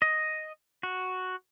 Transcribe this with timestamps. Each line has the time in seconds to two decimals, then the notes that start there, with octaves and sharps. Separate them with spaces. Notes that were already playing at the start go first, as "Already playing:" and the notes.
0.02 D#5
0.83 F#4